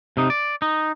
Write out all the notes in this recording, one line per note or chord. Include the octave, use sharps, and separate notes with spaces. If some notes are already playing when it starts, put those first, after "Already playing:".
C3 D#4
D5
D#4